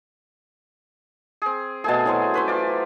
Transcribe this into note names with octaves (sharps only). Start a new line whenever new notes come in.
C4 G#4
B2 A3 G#4 A4 G#5 A5
E3 F#3 C5
C#4 B4 C5 E5 C6
F4 D5